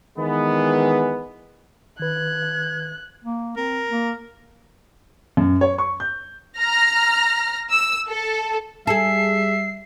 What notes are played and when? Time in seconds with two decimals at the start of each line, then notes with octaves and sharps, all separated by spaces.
0.19 D#3 E3 G#3 B3
2.00 D#3 B4 F#6 G#6
3.25 A#3
3.57 C4 A#4
3.91 A#3
5.37 F#2
5.61 C#5
5.78 C#6
6.00 G6
6.57 A#5 F6 A#6
7.72 E6
8.08 A4
8.87 G3 G#4 A4 E5 C7